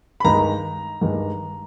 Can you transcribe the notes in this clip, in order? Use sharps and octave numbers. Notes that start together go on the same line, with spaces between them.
B5
G2 D#3 G#3 A#5
G2 D#3 G#3